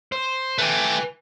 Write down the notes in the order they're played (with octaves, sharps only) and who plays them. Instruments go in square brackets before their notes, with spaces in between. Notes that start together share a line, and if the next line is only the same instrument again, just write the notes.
[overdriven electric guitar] C5
[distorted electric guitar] A3 G4 [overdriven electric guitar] B4 G#5